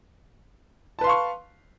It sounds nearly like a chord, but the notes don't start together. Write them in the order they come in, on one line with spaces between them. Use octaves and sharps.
A5 B4 C6 F5 C#6